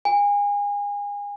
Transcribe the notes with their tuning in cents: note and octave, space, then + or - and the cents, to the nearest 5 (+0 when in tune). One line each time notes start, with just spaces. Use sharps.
G#5 -30